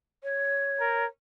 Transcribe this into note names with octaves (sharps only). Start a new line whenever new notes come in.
C#5
A#4